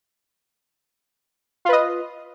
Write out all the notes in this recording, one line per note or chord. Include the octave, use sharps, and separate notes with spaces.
F4 B4 D#5